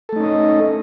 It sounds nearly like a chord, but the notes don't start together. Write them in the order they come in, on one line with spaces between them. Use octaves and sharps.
A4 A3 D#4 C#4 D#5